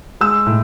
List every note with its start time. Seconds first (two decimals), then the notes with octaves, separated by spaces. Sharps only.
0.21 G#3 E6
0.46 A2